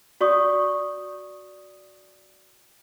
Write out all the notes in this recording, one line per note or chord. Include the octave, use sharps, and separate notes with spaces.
F#4 D5 C#6 D#6